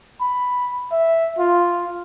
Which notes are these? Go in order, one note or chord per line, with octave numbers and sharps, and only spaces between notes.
B5
E5
F4